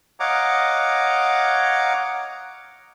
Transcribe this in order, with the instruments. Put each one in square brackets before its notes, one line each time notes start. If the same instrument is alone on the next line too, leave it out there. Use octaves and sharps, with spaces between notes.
[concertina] C#5 D#5 F5 F#5 A#5 D6